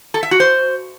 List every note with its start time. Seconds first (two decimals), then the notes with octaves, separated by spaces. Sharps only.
0.14 A4
0.23 E5
0.31 F#4
0.40 C5